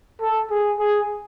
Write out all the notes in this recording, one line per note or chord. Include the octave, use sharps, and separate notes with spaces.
A4
G#4
G#4